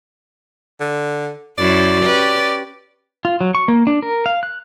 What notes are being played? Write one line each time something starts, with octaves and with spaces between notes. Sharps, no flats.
D3
F#2 C#4 E4 D5
C#4 G4 B4
F4
F#3
C#6
A#3
D4
A#4
F5
F#6